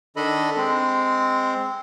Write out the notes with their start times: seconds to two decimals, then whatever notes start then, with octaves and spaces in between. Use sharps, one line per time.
0.16 D#3 D4 A4 D#5 B5
0.57 G#3 C4